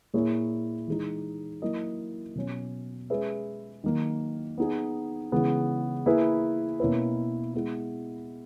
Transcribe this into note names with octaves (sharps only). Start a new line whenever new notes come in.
A#2 A#3 E4 G#4 C#5
E3 G#3 D#4
F#3 A#3 E4 A#4 D#5
B2 F#3 C#4
G#3 C#4 G#4 B4 E5
D#3 F#3 A#3
B3 D#4 G#4
C#3 E3 G#3 B3
A#3 E4 G#4 B4 E5
B2 A#3 C#4 E4 B4
G#3 B3 E4